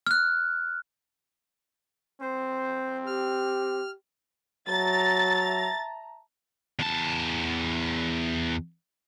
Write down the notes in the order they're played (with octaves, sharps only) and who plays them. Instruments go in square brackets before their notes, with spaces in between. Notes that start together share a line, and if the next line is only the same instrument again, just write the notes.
[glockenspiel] F6 F#6
[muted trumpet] C4 [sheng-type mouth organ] C5
[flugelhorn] G4 [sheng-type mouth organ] F6
[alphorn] F#3 [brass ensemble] E5 A5 A#5 [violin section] A6
[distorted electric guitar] E2 A5